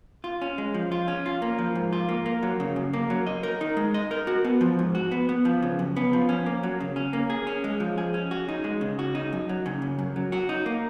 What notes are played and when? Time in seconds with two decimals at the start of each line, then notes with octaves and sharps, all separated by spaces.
0.24 F4
0.41 C#4
0.58 G#3
0.74 F3
0.92 F4
1.08 C#4
1.26 F4
1.42 A#3
1.59 F3
1.75 G#2
1.93 F4
2.09 A#3
2.26 A#3
2.43 F#3
2.60 C#3
2.76 F#2
2.93 A#3
3.10 F#3
3.27 D#5
3.43 A#4
3.61 D#4
3.77 G#3
3.94 D#5
4.11 A#4
4.27 F#4
4.44 B3
4.61 F3
4.79 G#2
4.95 F#4
5.12 B3
5.29 B3
5.45 F3
5.62 C#3
5.79 F#2
5.96 B3
6.13 F3
6.29 C#4
6.46 A#3
6.63 F#3
6.80 C#3
6.96 C#4
7.13 A#3
7.30 G#4
7.47 C#4
7.64 G#3
7.80 F3
7.98 G#4
8.14 C#4
8.31 F#4
8.49 D#4
8.64 G#3
8.81 C#3
8.99 F#4
9.15 D#4
9.33 F#2
9.49 F#3
9.66 C#3
9.82 F#2
9.99 F#2
10.16 F#3
10.32 F#4
10.49 D#4
10.66 A#3